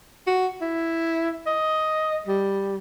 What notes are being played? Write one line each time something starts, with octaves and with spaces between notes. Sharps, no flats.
F#4
E4
D#5
G3